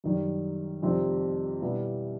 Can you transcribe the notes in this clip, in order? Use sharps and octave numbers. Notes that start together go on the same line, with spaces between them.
F#2 D#3 G3
F2 C3 D#3 G3 C4
B2 G3 B3 E4